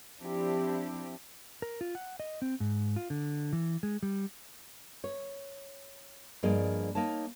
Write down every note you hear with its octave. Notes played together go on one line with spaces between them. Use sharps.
F3 C4 D4 E4 G4
A#4
F4
F#5
D#5
C4
G#2
F4
D3
E3
G#3
G3
C#5
G2 F3 A#3 G#4 D5 D#5
A#3 D#4 C#5 A5